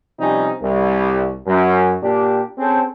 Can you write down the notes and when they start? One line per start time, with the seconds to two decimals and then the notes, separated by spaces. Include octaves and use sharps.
0.19 C3 F3 G3 C#4 D#4
0.61 C2
1.47 F#2
2.02 A#2 D4 G4
2.58 C4 C#4 G#4 A4 C5